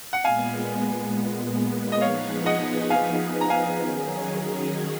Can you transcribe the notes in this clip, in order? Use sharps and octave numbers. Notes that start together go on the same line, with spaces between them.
F#5
A#2 G#3 B3 F5 G#5
D#5
F3 B3 D#4 G#4 B4 C#5 F5
D#5 F#5
F5 G#5
A#5
F5 G#5
D#3 F#3 C#4 G#4